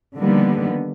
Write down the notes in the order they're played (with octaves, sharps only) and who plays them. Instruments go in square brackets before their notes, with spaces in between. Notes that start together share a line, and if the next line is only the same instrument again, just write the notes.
[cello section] D3 D#3 F3 G3 A#3 B3